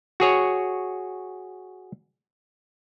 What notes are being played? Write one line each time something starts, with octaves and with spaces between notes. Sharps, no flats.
F#4 G#4 C#5